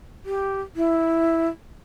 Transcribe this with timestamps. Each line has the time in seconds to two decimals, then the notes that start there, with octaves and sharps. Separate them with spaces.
0.25 G4
0.76 E4